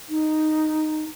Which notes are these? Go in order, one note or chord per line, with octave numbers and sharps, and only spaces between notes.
D#4